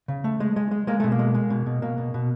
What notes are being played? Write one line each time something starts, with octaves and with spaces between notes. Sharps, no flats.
C#3
A3
G#3
G#3
G#3
G#3 A#3
B2 A3
A#3
G#3
G#3
B2
B2
B2 A#3
B2
B2